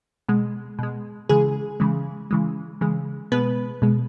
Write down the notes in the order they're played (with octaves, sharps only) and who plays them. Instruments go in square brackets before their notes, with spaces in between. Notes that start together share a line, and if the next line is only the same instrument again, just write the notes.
[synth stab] B2 G#3
B2 G#3
C#3 E3 G#3 G#4
C#3 E3 G#3
C#3 E3 G#3
C#3 E3 G#3
B2 G#3 B3 B4
B2 G#3